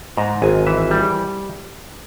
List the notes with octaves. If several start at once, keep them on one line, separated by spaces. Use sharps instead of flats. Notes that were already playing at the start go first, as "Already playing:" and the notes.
G#2 A#5
G#1 G#5
E3 E5
G3